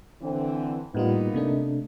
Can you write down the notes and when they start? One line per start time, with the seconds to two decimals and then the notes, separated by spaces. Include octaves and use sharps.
0.21 D3 E3 C4
0.94 A2 G3 A#3 B3 D#4 F4
1.34 C3 A3 D4